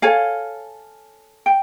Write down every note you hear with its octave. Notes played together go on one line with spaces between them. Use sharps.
A4 C#5 F5 G#5
G5